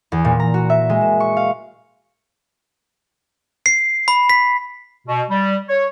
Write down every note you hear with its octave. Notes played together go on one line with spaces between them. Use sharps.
E2
A#2
A#5
F#4
E5
G#3
E7
C#6
F5
C7
B5
B6
B2
G3
C#5